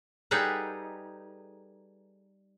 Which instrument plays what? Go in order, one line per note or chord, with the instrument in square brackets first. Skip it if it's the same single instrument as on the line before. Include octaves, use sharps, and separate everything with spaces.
[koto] G3 D#4 G#4 A4 B4 F#5